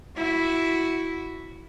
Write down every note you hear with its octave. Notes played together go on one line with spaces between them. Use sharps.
E4 F#4